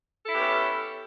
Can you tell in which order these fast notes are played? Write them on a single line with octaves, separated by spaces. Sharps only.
A4 E4 G4 B3 C#4